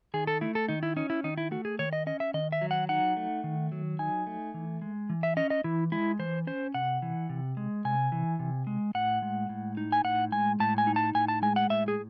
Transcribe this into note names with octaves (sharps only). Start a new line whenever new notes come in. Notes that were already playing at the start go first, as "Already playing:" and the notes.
D#3 G#4
A4
A3 E4
A4
D#3 D#4
E4
C#4 D#4
E4
D#3 D#4
E4
A3 F#4
G#4
D#3 C#5
D#5
C#4 D#5
E5
D#3 D#5
E5
F#3
F#5
D#4 F#5
A3
D#3
F#3
D#4 G#5
A3
E3
G#3
E3
E5
C#4 D#5
D#5
E3 E4
G#3 E4
E3 C5
C#4 C5
C3 F#5
E3
C3
G#3
C3 G#5
E3
C3
G#3
A2 F#5
G#3
A2
D#4
G#5
A2 F#5
G#3 G#5
A2 A5
G#5
D#4
A5
A2 G#5
A5
G#3 G#5
F#5
A2 E5
G#4